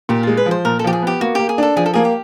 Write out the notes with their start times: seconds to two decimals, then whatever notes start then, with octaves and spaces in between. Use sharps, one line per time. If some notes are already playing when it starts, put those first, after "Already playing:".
0.09 A#2 G4
0.23 G#3 F4
0.37 B4
0.46 F3
0.51 C5
0.65 A#2 A#4
0.79 A4
0.84 F3 G4
0.93 G#4
1.02 B3 G4
1.21 A#3 F#4
1.35 A#3 G4
1.49 G#4
1.58 D4 A4
1.76 F3 G#4
1.86 A4
1.94 A#3 G#4
2.05 G4